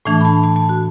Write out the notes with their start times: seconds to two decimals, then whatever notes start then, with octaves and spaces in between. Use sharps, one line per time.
0.05 A2 E3 A3 D4 A5
0.21 B5
0.25 A5
0.44 A5
0.56 A5
0.69 F#4